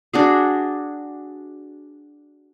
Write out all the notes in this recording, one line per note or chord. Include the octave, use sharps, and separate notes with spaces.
D4 F#4 G#4